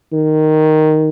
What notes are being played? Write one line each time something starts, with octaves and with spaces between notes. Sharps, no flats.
D#3